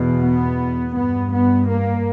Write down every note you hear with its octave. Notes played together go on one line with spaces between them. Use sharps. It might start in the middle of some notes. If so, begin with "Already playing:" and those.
Already playing: E2 B2
B3
G2 B3
B3
A#3